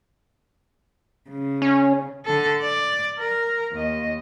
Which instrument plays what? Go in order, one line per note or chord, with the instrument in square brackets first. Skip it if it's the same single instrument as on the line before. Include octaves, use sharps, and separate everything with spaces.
[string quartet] C#3
[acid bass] C#4
[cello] D3 A4
D5
A#4
D#2 D#5